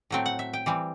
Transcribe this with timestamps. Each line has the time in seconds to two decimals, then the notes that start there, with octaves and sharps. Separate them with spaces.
0.10 A2 F#3 A3 C4 G5
0.26 F#5
0.39 E5
0.53 G5
0.66 E3 G3 C4